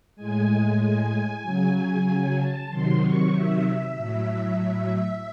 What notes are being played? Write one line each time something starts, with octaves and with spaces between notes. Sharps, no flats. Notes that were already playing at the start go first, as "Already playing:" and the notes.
A2 G#3 G#5
G#5
C#3 F#3
G#5
A5
C3 D#3 F#3 C6
C#6
E5
A2 F#3
E5